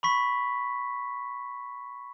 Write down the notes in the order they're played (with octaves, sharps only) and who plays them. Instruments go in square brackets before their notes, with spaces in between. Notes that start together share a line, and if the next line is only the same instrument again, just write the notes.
[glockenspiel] B5 C#6 B6